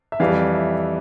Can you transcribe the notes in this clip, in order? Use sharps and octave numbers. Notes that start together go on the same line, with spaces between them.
E5
F2 E3 G3 F5
E5